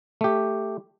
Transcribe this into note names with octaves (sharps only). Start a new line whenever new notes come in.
A3 G4